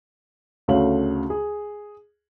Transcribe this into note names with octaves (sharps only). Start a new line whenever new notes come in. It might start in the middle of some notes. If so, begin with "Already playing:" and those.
D2 C#3 A3 C#5 F5 F#7
G#4